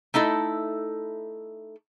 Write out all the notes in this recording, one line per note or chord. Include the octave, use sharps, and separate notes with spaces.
A3 D#4 E4 A4